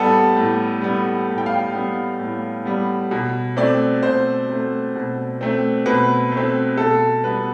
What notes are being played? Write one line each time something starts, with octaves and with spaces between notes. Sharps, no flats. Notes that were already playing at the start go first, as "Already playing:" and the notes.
Already playing: A2 G3 B3 G4 A4
A2
G3 B3
A2
G5
F5
G5
G3 B3
A2
G3 B3
B2
A3 C4 D5
B2 C5
A3 C4
B2
A3 C4
B2 B4
A3
C4
B2 A4
G3 B3 B4